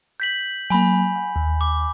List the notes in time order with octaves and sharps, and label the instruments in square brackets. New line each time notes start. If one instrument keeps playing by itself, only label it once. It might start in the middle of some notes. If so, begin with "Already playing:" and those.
[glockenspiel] G6 B6 F#7
[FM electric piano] F#3 A#3 [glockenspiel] G#5 B5
[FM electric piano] F#5
D#2
[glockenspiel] D6